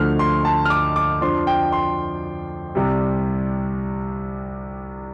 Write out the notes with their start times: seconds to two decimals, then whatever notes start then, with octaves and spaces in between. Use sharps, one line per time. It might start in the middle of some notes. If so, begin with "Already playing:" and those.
Already playing: D2 D3 F3 A3 D4 F6
0.19 C6
0.45 A5
0.65 F6
0.70 D6
0.96 D6
1.21 F2 F3 D4 C6
1.47 G5
1.72 C6
2.75 C2 C3 G3